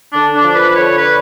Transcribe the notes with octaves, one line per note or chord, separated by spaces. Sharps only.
D3 D4
D4
F3
B4
D3 C#5
B4